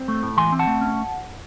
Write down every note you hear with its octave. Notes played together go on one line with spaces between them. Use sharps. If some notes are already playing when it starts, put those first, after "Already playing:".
Already playing: C4
A3
A2
E3 G#5 C6
C4
F#5 A5
A3
C#4